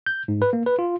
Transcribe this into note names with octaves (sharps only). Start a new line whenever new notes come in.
G6
G#2
B4
A#3
B4
F4